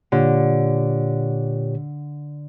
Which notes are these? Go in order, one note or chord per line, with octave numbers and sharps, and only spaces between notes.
A#2 D3 G4 C#5